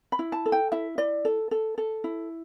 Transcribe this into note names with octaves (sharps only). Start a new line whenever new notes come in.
B5
E4
A5
A4
G5
E4 E5
E4 D5
A4
A4
A4
E4